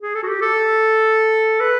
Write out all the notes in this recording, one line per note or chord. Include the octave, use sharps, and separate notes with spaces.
G#4
A4
F#4
G4
A4
B4